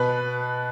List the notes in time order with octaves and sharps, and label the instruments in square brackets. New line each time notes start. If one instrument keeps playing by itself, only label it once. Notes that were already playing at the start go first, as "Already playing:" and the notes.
Already playing: [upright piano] B2 B4